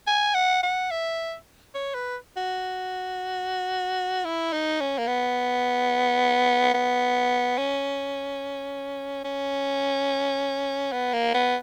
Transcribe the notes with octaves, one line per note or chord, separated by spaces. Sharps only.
G#5
F#5
F#5
E5
C#5
B4
F#4
E4
D#4
C#4
A#3
B3
B3
C#4
C#4
B3
A#3
B3